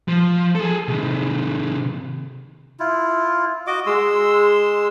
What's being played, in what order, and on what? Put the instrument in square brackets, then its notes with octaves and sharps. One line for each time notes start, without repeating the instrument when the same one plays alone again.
[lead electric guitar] F3
G#4 A4
C3 D#3
[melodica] E4 F4
F#4 D#5 D6
G#3 C6 E6